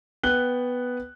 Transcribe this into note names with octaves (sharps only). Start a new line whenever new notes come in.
B3 G5 F#6 G7